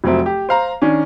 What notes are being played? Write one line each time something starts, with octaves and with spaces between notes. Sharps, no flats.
F1 F#3 C4 E5
G4
C5 F5 A#5
D#3 C#4 D4